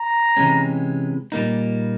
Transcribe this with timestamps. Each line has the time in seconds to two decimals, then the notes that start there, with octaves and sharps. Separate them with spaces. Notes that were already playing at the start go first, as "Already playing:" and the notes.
Already playing: A#5
0.37 C3 E3 G#3 C#4
1.32 A#2 G3 A#3 D#4